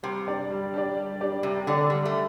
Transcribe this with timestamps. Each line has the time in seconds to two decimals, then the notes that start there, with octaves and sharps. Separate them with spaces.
0.03 C3 G3
0.27 D4 G4 D5
0.50 G3
0.74 D4 G4 D5
0.97 G3
1.21 D4 G4 D5
1.43 C3 G3
1.67 D3 D4 G4 D5
1.90 D3 G3
2.05 A3